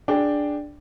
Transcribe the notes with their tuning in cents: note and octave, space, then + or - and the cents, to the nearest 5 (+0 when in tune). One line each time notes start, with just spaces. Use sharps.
D4 +0 G#4 +0 G5 +0